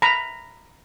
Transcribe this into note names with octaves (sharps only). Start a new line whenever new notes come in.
A#5 B5